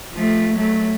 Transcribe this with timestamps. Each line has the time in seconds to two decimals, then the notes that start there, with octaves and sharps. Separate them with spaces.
0.13 F3 A3
0.54 F#3 A3